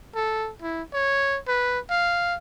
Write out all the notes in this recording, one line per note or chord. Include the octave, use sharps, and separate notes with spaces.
A4
E4
C#5
B4
F5